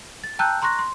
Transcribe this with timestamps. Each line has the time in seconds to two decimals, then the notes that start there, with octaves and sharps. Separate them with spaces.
0.24 A6
0.39 G5 A5 A#5 E6 F#6 G6
0.62 A#5 C6 C#6 F#6 A#6
0.79 C6